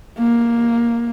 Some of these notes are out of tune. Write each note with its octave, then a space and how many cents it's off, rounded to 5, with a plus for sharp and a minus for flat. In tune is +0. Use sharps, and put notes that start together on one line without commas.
A#3 +10